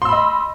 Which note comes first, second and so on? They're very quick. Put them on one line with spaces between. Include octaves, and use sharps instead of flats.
C6 E6 B5 D#5